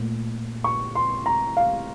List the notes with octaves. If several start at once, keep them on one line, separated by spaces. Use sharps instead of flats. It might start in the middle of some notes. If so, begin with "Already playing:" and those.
Already playing: A#2 A3
C#6
C6
A#5
F5